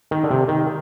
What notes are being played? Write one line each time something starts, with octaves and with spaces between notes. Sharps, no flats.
D#3
D3
C3
D#3